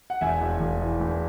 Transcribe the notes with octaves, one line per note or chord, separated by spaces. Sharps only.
F#5
E1 E5 G#5
E1
E1
E3
E1